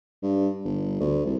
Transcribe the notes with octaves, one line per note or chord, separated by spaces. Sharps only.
G2
G1
D2
C2